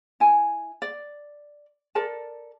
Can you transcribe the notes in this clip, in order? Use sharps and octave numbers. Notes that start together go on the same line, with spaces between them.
E4 G#5
D5
A4 A#4 D5 A5